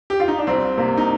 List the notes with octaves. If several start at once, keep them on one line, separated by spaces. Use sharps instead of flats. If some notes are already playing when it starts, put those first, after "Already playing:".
G4
F4
D#4
D4
C2 C4
C3 A#3
D#4